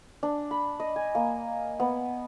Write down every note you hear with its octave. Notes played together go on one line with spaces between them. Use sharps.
D4
B5
D#5
G#5
A#3
B3